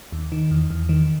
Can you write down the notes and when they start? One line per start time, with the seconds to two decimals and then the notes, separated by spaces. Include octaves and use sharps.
0.12 D#2
0.32 D#3
0.51 E2
0.70 E2
0.89 D#3